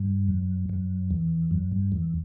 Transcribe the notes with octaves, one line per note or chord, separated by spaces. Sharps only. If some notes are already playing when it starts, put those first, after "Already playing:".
Already playing: G2
F#2
F#2
E2
F#2
G2
E2